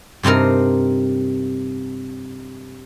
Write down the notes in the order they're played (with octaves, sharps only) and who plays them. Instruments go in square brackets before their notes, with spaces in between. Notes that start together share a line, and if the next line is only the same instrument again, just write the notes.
[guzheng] G2 C3 C4 D#4 A#4